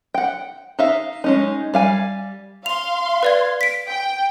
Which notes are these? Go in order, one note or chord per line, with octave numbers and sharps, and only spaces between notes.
F#5 G5
D#4 E5 F5
G#3 C#4 D#4
G3 F5 G#5
F5 C6 F7
B4 D5 G#6
B6 D7
G5